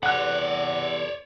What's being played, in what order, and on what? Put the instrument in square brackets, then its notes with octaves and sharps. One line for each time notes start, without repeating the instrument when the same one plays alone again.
[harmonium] E2 C3 A4 [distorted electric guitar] C#5 D5 [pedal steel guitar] F#5 F#6